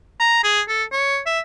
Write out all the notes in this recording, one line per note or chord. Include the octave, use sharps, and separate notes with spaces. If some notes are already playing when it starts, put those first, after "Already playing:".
A#5
G#4
A4
C#5
E5